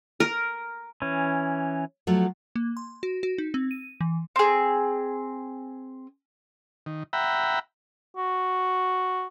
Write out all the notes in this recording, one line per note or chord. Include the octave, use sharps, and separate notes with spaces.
A#4
E3 C#4
F3 F#3 A3
A#3
C6
F#4
F#4
D#4
C4
D#7
E3
C4 G#4
D#3
E5 F#5 G5 A#5 B5
F#4